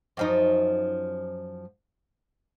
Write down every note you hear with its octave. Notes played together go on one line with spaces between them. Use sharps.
F#2 F3 D#4